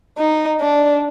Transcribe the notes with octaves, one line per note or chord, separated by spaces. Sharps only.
D#4
D4